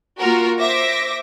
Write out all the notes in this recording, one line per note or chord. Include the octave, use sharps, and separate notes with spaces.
A#3 F4 F#4 A#4
C5 E5 D6 A#6